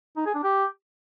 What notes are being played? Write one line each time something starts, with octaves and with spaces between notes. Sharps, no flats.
D#4
G#4
D4
G4